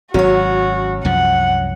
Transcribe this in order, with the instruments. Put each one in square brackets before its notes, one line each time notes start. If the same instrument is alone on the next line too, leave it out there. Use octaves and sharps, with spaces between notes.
[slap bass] G#1 [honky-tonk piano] F#3 [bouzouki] C#4 C#5 [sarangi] F#4
[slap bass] C2 F#2 F3 [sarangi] F#5